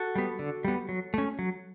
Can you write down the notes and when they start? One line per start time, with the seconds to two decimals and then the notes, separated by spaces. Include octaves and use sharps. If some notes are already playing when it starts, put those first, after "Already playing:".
Already playing: F#4 A4
0.15 G3 B3
0.39 D3
0.65 G3 B3
0.89 F#3
1.14 A3 C#4
1.39 F#3